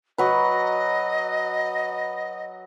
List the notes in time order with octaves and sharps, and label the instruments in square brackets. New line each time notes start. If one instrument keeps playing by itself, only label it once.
[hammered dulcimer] F#3 B4 [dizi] D#5